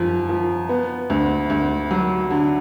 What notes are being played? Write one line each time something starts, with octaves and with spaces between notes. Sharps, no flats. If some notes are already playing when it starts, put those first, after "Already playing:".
Already playing: F#2 F3
F3
B3
D2
D2
F#3
D3